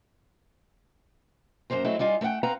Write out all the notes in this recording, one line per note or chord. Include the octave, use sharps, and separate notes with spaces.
F#2 D#3 A#3 C5 A#5
F#3 G#3 A3 C4 E4 A4
G3 D#4 F4 G#4
A3 A#4 E5 F#5 G5
C4 B4 F5 F#5 A#5